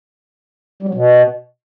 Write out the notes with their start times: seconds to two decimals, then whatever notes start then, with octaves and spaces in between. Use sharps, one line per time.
0.83 G3
0.88 F#3
0.94 B2